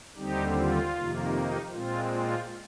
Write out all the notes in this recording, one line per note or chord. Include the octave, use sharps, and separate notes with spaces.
D#2 D3 G3 C4 D#4 G4
F4
F2 C3 D#3 A#3
D#4
A#2 G#3 C4 F4
F4